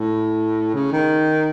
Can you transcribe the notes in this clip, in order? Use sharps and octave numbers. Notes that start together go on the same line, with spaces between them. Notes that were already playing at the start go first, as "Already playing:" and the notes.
Already playing: A2
C#3
D#3